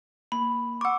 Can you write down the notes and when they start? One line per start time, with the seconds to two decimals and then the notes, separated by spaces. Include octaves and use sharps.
0.32 A#3 B5
0.81 F#5 C#6 D6 E6